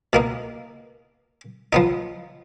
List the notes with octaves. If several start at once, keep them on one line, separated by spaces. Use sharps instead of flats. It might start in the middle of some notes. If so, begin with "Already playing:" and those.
B2 A#3 D#4
F3 B3 D#4